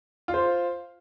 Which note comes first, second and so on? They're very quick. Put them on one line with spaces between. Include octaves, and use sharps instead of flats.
F4 F5 C5